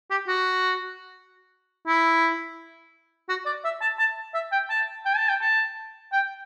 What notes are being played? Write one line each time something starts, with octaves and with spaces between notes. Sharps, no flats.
G4
F#4
E4
F#4
D5
E5
A5
A5
E5
G5
A5
G5
A5
G5
A5
G5